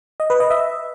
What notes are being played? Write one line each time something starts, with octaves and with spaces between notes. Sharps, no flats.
D#5
B4
D#5
E5